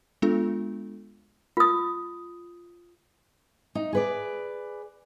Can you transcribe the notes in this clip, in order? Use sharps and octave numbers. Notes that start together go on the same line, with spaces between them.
G#3 B3 D4 F4 A4
F4 D#6
D#4
G#4 B4 D5